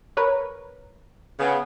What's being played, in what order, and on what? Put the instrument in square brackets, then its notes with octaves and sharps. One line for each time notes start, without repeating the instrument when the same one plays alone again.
[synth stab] A#4 B4 C#5
[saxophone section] C#3 B3